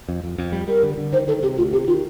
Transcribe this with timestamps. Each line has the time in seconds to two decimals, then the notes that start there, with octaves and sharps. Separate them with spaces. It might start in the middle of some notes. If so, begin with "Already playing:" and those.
0.09 F2
0.24 F2
0.38 F2
0.52 G3
0.68 G3 A#4
0.83 D3
0.98 D3
1.13 D#3 C5
1.27 D#3 A4
1.42 C3 G4
1.58 D2 F4
1.73 C3 G4
1.87 D#3 F4